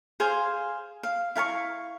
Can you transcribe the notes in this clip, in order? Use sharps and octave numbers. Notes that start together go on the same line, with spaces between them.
G#4 C5 F5 G#5
F5
E4 F5 A5 C#6